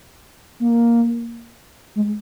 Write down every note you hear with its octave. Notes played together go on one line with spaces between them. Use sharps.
A#3
G#3